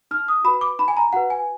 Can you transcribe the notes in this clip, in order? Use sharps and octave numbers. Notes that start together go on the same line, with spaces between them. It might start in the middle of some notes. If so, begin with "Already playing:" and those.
D#4 F6
D#6
F#4 B4 B5
D6
D#4 B5
G#5
A#5
F#4 B4 F#5
G#5